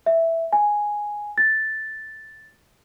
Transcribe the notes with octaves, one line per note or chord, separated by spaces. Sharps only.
E5
G#5
A6